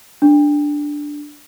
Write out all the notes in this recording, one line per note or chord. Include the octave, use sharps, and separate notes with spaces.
D4